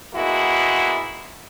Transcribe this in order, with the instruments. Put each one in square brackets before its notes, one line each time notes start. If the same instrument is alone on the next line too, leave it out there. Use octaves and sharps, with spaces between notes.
[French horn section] G#3 A#3 B3 E4 F#4